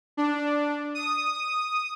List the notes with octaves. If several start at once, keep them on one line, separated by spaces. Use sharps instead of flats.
D4
D#6